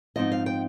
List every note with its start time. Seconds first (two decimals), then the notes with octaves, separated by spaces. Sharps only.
0.16 G#2 F3 C4 D#4 D#5
0.32 F5
0.46 G5